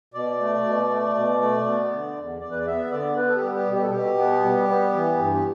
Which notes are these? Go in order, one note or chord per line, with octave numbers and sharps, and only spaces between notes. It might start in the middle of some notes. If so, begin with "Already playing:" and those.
B2 D5
A3
B2
A3
B2
A3
B3
D3
E2
E2 D5
B4
D5
B3 E5
D3 D5
B3 B4
A4
G4
G3
G4
B2
G4
A4
B2 G4
B3
G3
B3
E3
G2
G4